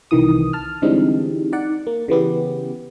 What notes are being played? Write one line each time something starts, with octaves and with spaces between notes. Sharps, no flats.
C2 D#3 E3 D#6
A5 F6
D3 E3 G3 G#3 C4 D#4
D#4 D5 F#5
A#3
C#3 E3 B3 G4